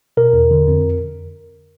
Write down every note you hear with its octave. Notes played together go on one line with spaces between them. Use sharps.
B2 A#4
E2
D3
F2